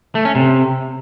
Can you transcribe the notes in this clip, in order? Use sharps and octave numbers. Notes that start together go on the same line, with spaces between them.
A3
C#4
C3